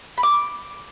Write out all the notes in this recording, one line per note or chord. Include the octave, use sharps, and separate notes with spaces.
B5
D6